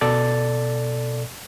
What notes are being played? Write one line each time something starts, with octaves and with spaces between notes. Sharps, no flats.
B2 A4 D5 A6